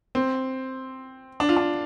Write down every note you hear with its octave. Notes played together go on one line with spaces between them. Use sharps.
C4
D4
F4
D4